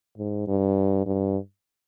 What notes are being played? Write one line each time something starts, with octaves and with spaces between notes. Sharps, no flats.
G#2
G2
G2